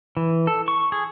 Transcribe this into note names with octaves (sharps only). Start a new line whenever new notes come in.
E3
A4
C#6
G#4